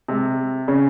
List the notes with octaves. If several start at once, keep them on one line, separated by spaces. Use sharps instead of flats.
C3 G#3
C#3 C#4